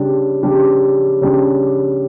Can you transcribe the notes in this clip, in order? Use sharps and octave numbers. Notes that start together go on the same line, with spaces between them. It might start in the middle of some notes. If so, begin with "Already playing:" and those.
Already playing: C#3 G3 D4
C#3 G3 D4
C#3 G3 D4